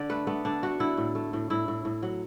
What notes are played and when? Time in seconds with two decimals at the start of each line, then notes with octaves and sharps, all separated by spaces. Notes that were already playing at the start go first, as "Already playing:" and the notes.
Already playing: D3 D5
0.09 A3 B4
0.27 A3 B3
0.45 D3 D4
0.63 A3 F#4
0.80 D3 E4
0.97 A2
1.15 A3
1.33 A2
1.50 A2 E4
1.68 A2
1.85 A2
2.03 F#3